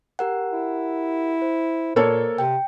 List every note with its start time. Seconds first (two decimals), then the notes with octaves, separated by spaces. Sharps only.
0.19 G4 A#4 F#5
0.53 E4
1.42 C5
1.96 A#2 A#3 A4 C#5
2.38 C3 G5